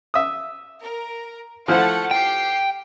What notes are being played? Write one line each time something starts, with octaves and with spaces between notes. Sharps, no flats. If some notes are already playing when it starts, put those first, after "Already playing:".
E5 D#6
A#4
F3 A3 E4 A4 C5 F#5
G4 G5 C7